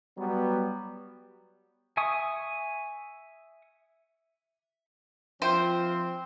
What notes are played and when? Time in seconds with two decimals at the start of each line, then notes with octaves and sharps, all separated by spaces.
0.18 F#3 G3 B3
1.97 E5 G#5 C#6 D#6
5.42 F3 C4 C5 E5 G5 G6